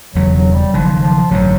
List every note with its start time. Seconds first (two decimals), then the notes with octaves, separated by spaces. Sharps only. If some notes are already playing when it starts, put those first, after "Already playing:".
0.15 E1 E2 C#3 E3 F#3
0.35 F#3
0.54 G3
0.73 F#1 F#2 D#3 F3
1.03 F3
1.30 A1 G2 D3 F#3